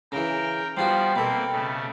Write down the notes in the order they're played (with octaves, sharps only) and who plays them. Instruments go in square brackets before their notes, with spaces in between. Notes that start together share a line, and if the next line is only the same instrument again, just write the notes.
[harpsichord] C#3 E3 [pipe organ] A#4 G5 A#5
[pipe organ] F3 B3 [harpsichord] G3 F4 F#4 [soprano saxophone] C5 [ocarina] G5
[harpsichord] B2 A4 [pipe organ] A#3 C4 [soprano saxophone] B5
[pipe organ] C#3 A3